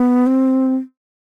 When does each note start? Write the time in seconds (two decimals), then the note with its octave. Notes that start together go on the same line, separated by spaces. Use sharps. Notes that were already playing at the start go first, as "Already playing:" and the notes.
Already playing: B3
0.26 C4